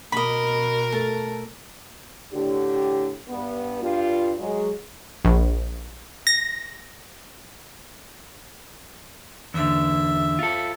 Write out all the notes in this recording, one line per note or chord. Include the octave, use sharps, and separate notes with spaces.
B2 A#4 D#5 B5
A3 A4 A5
A2 D3 G4
G2 B3
G2 F4
F#3 G#3
A#1
A#6
E2 D3 E5
F4 A4